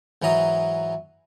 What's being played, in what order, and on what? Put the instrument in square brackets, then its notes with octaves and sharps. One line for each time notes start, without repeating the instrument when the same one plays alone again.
[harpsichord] G#2 E3 F#3 A#5 D#6